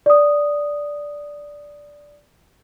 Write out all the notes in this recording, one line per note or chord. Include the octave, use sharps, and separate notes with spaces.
D5 D#6